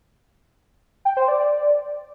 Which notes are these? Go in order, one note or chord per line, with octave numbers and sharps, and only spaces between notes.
G5
C5
D5
D5